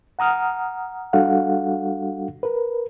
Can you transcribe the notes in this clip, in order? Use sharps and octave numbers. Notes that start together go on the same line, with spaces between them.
F#5 A#5 D#6 F6
G3 D4 F#4 A4 F5 F#5
A#4 B4